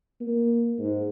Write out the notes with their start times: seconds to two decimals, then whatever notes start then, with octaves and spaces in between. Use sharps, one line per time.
0.21 A#3
0.78 G#2